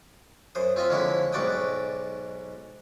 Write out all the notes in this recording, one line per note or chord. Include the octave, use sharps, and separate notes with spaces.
F#2 C5 D#6
C4 F4 D#5 E5
F2 D3 G#3 C#4 E4
B1 G#2 F#4 D5 G5 D#6